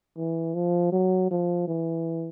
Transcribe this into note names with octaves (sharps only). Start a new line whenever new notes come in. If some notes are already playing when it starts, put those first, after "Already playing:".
E3
F3
F#3
F3
E3